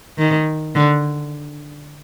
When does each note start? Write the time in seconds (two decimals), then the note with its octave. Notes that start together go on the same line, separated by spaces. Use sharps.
0.18 D#3
0.75 D3